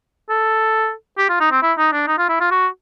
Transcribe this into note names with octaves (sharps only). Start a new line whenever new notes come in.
A4
G4
F4
D#4
C4
E4
D#4
D4
D#4
F4
E4
F4
F#4